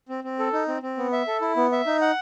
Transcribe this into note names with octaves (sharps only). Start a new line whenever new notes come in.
C4
C4
A4
D#4
C4
C4
B3
E5
A4
E4
B3
E5
D#4
F#5